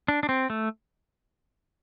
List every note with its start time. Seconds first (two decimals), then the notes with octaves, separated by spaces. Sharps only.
0.08 D4
0.23 D4
0.29 C4
0.50 A3